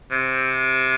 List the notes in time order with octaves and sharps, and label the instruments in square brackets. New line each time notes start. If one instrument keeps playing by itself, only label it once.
[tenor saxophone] C3